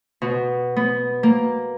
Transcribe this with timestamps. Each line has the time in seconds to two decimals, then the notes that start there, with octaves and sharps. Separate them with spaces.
0.22 B2
0.76 B3
1.23 A#3